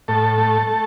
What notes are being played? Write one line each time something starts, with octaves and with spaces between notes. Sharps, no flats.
A2 A4
A3
A3